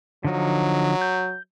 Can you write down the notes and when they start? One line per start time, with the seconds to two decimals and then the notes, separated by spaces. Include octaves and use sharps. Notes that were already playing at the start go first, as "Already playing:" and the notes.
0.25 D3 F3 F#3 D#4
1.01 G6